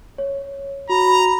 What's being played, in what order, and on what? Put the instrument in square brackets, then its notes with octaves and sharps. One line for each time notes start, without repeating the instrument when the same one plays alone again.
[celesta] C#5
[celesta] F#4 [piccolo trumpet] A#5 [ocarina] B5